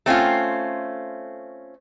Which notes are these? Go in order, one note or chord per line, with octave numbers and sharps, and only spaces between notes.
A3 C4 C#4 F4